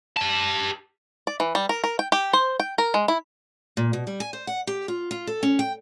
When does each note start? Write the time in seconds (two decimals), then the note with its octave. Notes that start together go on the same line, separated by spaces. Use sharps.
0.17 G4 A5
1.27 D5
1.40 E3
1.55 G3
1.69 A#4
1.84 A#4
1.99 G5
2.12 G4
2.33 C5
2.60 G5
2.78 A#4
2.94 G#3
3.08 E4
3.77 A#2
3.93 B2
4.07 G3
4.20 G#5
4.33 C5
4.47 F#5
4.67 G4
4.88 F4
5.11 F4
5.27 A4
5.43 C#4
5.59 G5